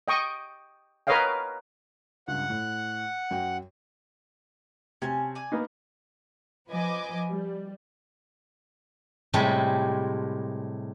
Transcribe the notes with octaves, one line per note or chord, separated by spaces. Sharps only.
D#5 G5 C#6 D#6
A#4 B4 C#5 D#5 F5 G5
C#2 G2 F#5
A2
F#2 F#4 G5
C3 C#4 G#5 A5
D5 G#5
A#3 B3 D#4
F3 B4 D#5 G#5 D6
G3
A2 C3 G3 G#3 G4 A4